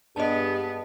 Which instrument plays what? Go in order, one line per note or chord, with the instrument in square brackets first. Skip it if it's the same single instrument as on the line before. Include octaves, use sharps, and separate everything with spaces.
[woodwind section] G2 [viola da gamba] B3 [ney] G#4 [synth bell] D#5 A5